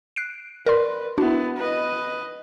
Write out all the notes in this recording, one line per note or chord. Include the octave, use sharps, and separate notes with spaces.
F#6 C7 D7
A#4 B4 D5 C6
B3 D4 E4 F#4
B4 D#5